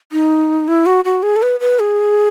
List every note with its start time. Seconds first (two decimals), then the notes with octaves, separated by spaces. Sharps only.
0.12 D#4
0.68 E4
0.86 F#4
1.05 F#4
1.23 G#4
1.36 A4
1.42 B4
1.60 B4
1.79 G#4